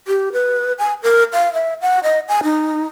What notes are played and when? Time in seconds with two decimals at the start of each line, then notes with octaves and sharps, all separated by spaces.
0.08 G4
0.33 B4
0.79 G#5
1.03 A#4
1.33 F5
1.54 E5
1.82 F#5
2.04 D#5
2.29 G#5
2.44 D#4